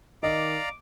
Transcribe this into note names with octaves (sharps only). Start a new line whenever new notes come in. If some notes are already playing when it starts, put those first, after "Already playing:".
D#3 D5 D#5 F5 A#5 D6